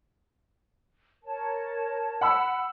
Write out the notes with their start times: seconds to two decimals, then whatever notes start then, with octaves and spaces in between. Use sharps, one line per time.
1.24 A#4 C#5 A5
2.21 F#5 B5 E6